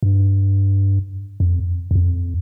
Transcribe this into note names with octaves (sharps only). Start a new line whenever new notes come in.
G2
F2
E2
F2